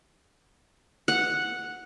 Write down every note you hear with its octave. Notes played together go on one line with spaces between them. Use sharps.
F#5